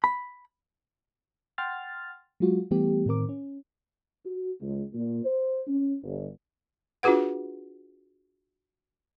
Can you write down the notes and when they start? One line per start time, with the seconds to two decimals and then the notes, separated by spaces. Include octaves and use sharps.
0.04 B5
1.58 F#5 G5 C6 F6 A6
2.40 F#3 G#3 F4 F#4
2.71 E3 G3 A3 B3 G4
3.06 A2 D#3 C4 A#4 D6
3.29 C#4
4.25 F#4
4.62 C#2
4.93 A#2
5.25 C5
5.68 C#4
6.02 G1
7.03 D4 F4 F#4 G#4 B4 F#5